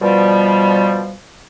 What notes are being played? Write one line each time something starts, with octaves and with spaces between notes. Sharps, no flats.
B2 F3 G3